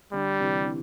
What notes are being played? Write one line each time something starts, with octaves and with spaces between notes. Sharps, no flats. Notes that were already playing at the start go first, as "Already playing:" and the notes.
D3 G3
C3 E3
E3